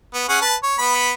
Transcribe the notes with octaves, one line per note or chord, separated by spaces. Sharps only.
B3
C#4 G#4 F#5
B4 A5
C#5
B3 B5